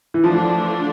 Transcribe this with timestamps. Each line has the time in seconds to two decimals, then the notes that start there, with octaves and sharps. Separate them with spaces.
0.14 E3
0.23 D3 F3 A3 D4 F4